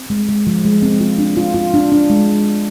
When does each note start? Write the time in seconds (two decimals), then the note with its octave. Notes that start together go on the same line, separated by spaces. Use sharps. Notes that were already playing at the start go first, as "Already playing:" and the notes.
Already playing: C4
0.10 G#3
0.29 G#3
0.47 F3
0.65 G#3
0.83 C4
1.00 F4
1.18 D4
1.37 F4
1.54 F4
1.74 D4
1.92 D4
2.09 G#3